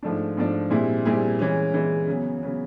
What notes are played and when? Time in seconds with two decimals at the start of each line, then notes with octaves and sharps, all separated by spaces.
0.03 G#2 F3 A3 D4
0.37 G#2 F3 A3 D4
0.70 A#2 G3 C4 E4 G#4
1.05 A#2 G3 C4 E4 G#4
1.39 E3 G#3 C#4
1.74 E3 G#3 C#4
2.08 C#3 F#3 B3
2.43 C#3 F#3 B3